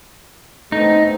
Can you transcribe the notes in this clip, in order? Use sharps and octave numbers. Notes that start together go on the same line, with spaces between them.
A3 B3 C4 D#4